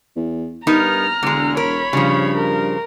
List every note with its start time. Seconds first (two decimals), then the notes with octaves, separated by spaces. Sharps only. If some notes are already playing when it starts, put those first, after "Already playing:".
0.16 E2
0.67 G2 B3 D#4 A#4 A#5 F6
1.23 E1 D3 G#3
1.57 A#4 C#5 B5
1.93 G2 C#3 F3
2.37 A#4